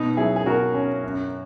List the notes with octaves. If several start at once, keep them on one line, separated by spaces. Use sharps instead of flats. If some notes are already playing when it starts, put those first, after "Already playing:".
Already playing: B2 D#4
F#3 E4 G#4
G#4
B2 F#4 A#4
C#4
F#2